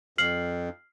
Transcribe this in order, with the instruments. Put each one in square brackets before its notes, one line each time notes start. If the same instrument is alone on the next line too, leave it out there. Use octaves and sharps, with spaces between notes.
[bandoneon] F2 [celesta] F6 C7 F#7